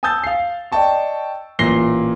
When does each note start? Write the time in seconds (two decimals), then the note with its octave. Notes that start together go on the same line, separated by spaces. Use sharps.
0.03 G#5 A5 D#6 E6 G6 A6
0.24 F5 C7
0.72 D5 D#5 G5 A5 C#6
1.59 A1 A#2 A#6 C7 G7